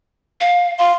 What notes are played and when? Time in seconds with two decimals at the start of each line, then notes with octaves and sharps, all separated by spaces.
0.41 F5
0.79 F5 C6